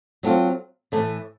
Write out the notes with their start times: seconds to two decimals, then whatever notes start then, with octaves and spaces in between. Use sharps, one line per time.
0.23 F#3 A3 C4 F4
0.92 A2 E3 A3